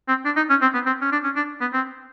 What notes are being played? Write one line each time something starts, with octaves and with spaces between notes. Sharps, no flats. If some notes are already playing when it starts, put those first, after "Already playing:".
C4
D4
D#4
C#4
C4
B3
C4
C#4
D4
C#4
D4
B3
C4